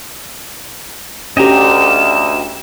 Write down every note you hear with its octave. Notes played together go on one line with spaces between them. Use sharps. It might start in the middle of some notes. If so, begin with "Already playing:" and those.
D2 C#4 G4 D#5 G5 A#5 E7